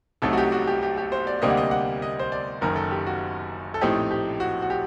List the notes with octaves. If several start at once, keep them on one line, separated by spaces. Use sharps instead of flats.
C2 C3 F#3 A3 D#4 A4
F#4
G4
F#4
G4
G4
G4
C5
D5
D2 C3 G3 A#3 D4 D#5
F#5
D#5
F#5
D#5
C5
D5
F#1 F#2 D#3 A#4
A4
G4
F#4
A4
A#1 A2 A3 C4 D#4 G4
G4
F#4
F#4
G4